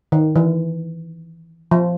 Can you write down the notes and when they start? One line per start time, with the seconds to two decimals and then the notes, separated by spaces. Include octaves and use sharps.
0.12 D#3
0.36 E3
1.71 F3